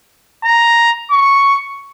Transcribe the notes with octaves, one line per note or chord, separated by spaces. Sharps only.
A#5
C#6